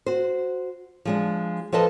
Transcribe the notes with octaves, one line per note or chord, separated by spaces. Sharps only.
F#4 C5
F3 G#3 D4
F3 A4 B4 D#5 A5